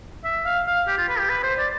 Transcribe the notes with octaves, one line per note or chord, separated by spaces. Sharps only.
E5
F5
F5
G4
F4
B4
G4
B4
C5
D5